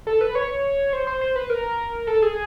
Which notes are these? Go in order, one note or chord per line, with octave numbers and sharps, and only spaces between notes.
A4
B4
C#5
C5
C5
C5
B4
A#4
A4
G#4